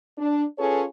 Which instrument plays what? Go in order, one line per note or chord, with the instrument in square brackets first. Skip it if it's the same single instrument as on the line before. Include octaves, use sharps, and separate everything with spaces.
[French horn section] D4
C#4 F4 G#4 A4 B4 C#5